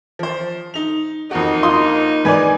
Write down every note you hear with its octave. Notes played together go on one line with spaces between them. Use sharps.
F3 C5
D#4 F7
F2 A#3 D#4 F#4
F4 C6 D#6
G#2 B4 D5 G#5 G#6